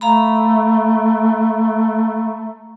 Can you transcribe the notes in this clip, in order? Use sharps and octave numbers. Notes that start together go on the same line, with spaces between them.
A3 F5 A#5 B5